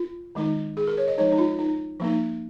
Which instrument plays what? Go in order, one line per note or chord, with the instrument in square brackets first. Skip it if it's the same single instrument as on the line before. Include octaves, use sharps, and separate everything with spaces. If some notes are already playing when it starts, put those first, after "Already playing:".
Already playing: [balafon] F4
D#3 G#3 D#4
G#4
A#4
C#5
D#5
F3 G#3 D#4 C#5
D#4
F4
D#4
F3 A#3 D#4